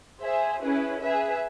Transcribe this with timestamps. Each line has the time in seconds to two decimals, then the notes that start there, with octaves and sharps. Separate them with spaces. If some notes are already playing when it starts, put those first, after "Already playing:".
0.23 G#4 C5 E5
0.62 C#4 E4 G#4 B4
1.00 G#4 B4 E5